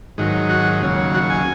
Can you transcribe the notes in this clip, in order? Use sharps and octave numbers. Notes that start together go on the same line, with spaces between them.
G#2 D#3 F#3
F#4
D#2 C#3 F#3
F#4
G#5